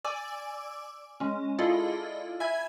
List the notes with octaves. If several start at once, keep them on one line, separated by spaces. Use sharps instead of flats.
D5 G#5 D6 E6
G#3 C#4
E4 F4 G#4 A4 D5 D#5
E5 G#5 B5 G#6